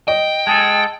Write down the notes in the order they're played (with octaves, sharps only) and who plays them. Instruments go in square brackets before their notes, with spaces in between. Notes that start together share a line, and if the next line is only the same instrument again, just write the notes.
[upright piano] D#5 [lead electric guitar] G5
[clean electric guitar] G#3 G#4 A4 [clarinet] A5